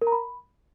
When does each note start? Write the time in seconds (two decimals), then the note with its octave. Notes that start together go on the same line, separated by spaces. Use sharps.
0.02 A#4
0.07 A#5
0.12 B5